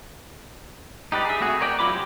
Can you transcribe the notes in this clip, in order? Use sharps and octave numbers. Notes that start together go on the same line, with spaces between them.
D#4 G4 B4 D5
G#4 E5
A3 C4 F#4 G#4
A#4 C#5 D5 G5
F#3 E4 F4 B5 D6
G4 C5